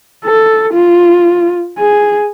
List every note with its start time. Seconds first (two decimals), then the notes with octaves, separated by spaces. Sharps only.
0.25 A4
0.73 F4
1.79 G#4